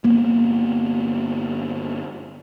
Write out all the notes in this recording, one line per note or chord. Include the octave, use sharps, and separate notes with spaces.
G1 A#3 B3